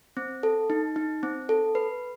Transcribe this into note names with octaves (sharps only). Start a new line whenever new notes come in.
C4
A4
D#4
D#4
C4
A4
B4